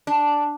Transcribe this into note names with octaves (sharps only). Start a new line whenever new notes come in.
D4